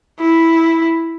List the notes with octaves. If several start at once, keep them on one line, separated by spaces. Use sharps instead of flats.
E4